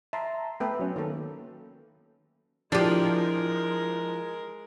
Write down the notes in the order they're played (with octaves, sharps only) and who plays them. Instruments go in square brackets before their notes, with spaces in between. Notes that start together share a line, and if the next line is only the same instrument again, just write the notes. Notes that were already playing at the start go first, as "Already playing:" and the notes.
[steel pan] E5 [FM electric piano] A5 A#5 C6
[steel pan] A3 B3 B4 [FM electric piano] E5 G5
[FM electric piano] F#3 C#4
[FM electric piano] D#3 [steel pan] A#3 A4
[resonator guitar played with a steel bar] F3 [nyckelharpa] G#3 A#4 [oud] D4 G4 [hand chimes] E4 A6